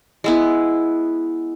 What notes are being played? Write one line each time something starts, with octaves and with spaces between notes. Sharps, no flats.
G#3 B3 E4